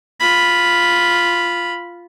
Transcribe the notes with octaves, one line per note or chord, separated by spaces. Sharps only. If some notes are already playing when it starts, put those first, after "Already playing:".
F4 B5